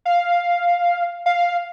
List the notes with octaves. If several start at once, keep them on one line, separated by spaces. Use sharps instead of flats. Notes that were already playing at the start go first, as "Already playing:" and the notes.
F5
F5